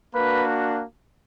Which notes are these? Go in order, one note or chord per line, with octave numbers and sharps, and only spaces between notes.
A#3 D4 F#4 B4